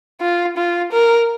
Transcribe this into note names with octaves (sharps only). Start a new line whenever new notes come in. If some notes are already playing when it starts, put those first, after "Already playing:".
F4
F4
A#4